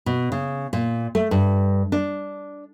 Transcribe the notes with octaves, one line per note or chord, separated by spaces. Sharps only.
B2
C#3
A#2
A3
G2
D4